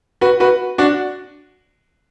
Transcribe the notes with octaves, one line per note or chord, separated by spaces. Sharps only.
F#4 B4
F#4 B4
D4 F#4